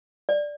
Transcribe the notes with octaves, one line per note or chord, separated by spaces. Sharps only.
D5